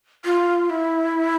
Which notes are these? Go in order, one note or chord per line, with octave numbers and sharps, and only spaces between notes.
F4
E4